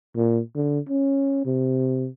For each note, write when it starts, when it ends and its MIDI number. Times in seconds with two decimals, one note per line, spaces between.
0.16 0.40 46
0.55 0.79 50
0.89 1.45 61
1.45 2.08 48